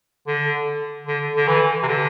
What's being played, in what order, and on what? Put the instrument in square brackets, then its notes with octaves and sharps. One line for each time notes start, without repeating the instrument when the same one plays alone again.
[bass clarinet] D3
D3
D3
E3
C3
D3